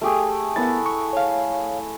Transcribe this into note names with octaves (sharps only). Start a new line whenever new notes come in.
A3 G4 G#4
B3 E4 A#4 F#5 A6
C#6
C#5 F5